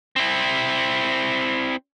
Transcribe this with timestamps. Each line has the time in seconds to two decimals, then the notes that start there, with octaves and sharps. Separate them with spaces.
0.16 C4 E4